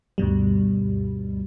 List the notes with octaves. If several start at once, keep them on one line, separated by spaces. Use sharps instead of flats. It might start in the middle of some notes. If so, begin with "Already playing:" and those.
D2 G2 B2 G3